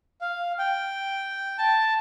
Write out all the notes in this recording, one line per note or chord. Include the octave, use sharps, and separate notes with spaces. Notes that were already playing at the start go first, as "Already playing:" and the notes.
F5
G5
A5